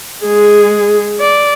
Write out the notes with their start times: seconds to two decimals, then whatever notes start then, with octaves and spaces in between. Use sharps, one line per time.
0.24 G#3 G#4
1.20 D5